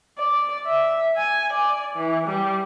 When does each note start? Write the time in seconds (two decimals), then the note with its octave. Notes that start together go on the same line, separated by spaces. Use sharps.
0.19 D5
0.67 E5
1.17 G#5
1.54 D5
1.96 E3
2.28 G3